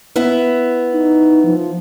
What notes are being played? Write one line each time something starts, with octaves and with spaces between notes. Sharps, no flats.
B3 E4 E5
D#4
F3